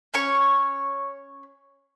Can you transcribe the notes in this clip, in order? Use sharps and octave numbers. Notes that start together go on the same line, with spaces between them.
C#4 C#5 C#6